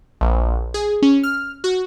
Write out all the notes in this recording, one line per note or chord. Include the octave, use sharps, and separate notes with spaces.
A#1
G#4
C#4
F6
F#4